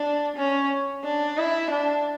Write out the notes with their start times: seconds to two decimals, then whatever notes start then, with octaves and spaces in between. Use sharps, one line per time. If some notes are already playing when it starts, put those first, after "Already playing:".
Already playing: D4
0.36 C#4
1.04 D4
1.38 E4
1.71 D4